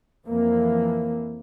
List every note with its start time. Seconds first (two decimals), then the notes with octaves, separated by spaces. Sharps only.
0.26 F2 E3 A#3